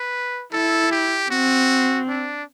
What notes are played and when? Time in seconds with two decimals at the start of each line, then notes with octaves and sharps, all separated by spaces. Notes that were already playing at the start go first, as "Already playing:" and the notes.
Already playing: B4
0.53 E4 A4
0.91 G4
1.30 C4 F#4
2.08 D4